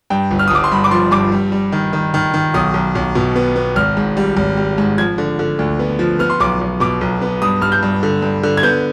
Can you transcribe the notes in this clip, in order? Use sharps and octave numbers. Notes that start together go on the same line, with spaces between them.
G2 G5
G1
F6
D#6
G1 D6
C6
G2 B5
D6
F3 C6
G2 D6
G3
G3
D#3
D#3
D#3
D#3
B1 D#6
B1
B1
B2
B3
B3
G#1 F6
G#2
G3
G#1
G3
G#2
F3 G#6
D3
D3
D2
B3
F3
B3 F6
C6
B1 D6
B1
B2 D6
B1
B3
G2 D#6
G2 F6
G6
G2
D3
G2
D3
G#6
B3 G6